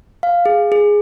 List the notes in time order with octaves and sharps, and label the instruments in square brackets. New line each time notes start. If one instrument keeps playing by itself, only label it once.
[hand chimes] F5
G#4
G#4